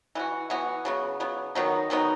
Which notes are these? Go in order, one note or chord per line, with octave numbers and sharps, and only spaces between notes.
E3 B3 F#4
E3 B3 F#4
C#3 F#3 B3
C#3 F#3 B3
D#3 F#3 B3 D#4
D#3 F#3 B3 D#4